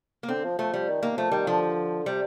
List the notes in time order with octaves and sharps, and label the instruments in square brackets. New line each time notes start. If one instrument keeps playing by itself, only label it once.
[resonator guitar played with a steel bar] A#3
[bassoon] D3 [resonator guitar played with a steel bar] C4
[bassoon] F3
[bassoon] F3 [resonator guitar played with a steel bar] A3
[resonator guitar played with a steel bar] G3
[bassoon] D#3
[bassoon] D#3 [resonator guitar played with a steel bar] A#3
[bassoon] F3 [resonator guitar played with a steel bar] A3
[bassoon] D#3 [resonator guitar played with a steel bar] G3
[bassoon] D3 [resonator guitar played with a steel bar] F3
[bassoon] C3 [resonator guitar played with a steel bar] G3